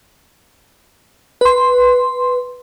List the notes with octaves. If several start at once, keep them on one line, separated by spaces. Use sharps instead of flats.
B4 C6